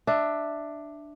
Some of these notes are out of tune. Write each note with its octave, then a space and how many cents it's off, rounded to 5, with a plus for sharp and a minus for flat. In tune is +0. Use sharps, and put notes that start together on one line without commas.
D4 +10 E5 +0